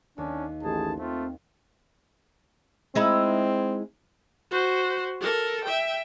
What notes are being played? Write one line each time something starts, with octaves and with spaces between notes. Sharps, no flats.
D#2 C#4 D4
A1 D#3 G#4 C5 A5
A3 C4 F4
G#3 C4 D#4 E4
F#4 C5
A4 A#4
E5 G5